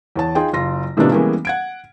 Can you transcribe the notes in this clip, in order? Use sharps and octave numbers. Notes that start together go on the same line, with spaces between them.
E2 C#5 A5
D#4 F4 G#4 G5
F#1 F4 A#6
A2 C3 D#3 F3 B3 D4
E3 G3 G#3 A#3 B3 C#4
F#5 G#6 D7